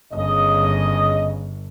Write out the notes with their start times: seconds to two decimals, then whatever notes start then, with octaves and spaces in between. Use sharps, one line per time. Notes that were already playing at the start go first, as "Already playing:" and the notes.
0.13 G1 C#3 D#5